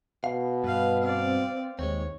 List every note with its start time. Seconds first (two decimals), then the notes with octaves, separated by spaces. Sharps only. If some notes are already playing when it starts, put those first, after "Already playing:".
0.24 B2 F5
0.64 G2 B4 F5
1.03 C4 D5 F5
1.79 D#2 G#3 C4 C#5